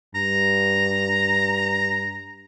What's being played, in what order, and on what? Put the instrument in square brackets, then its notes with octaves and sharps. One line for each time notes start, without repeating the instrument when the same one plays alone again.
[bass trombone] G2 [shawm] A#5